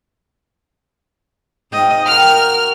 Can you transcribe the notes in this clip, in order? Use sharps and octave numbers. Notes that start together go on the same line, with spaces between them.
G#2 D#5 F5 G5
F#4 G4 A#4 G5 F6